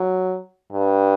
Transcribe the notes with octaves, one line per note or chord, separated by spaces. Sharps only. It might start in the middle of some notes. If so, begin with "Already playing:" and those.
Already playing: F#3
G2